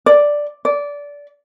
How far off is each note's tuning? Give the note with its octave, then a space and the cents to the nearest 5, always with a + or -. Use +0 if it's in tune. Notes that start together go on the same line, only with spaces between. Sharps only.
D5 +0
D5 -20